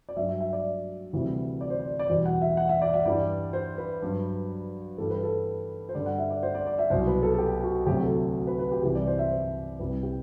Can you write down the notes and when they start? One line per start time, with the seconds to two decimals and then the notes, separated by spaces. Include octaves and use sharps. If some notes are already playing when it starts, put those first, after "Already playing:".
0.09 D5
0.16 G2 F#3 E5
0.29 E5
0.41 E5
0.53 D5
1.13 D2 C3 E3 G3
1.61 D5
1.70 C5
1.80 D5
1.99 D5
2.09 E2 B2 G3 C5
2.26 F#5
2.42 E5
2.57 F#5
2.69 E5
2.82 D5
2.94 E5
3.05 G2 E3 G3 D5
3.53 C5
3.78 B4
4.02 G2 F#3
4.98 G2 E3 G3 A4
5.10 B4
5.23 A4
5.89 C5
5.94 G2 D3 G3 D5
6.06 F#5
6.19 E5
6.31 D5
6.43 C5
6.55 D5
6.67 D5
6.79 E5
6.90 C2 B2 F#3 C5
7.07 B4
7.23 A4
7.34 A4
7.38 G4
7.63 F#4
7.86 D2 C3 F#3 G4
8.03 A4
8.47 B4
8.59 B4
8.72 G4
8.83 C2 C3 E3 G3 G4
8.95 D5
9.07 C5
9.19 E5
9.31 C5
9.79 C2 C3 G3 B4
10.03 G4